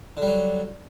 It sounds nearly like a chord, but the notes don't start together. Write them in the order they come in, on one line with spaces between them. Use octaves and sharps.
D3 G3 F#3